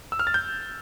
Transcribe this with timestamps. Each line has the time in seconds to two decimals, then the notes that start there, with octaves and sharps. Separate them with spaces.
0.12 E6
0.19 F6
0.27 A6
0.34 G6